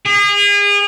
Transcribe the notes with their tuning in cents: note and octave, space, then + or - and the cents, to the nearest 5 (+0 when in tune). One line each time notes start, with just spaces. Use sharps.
G#4 -35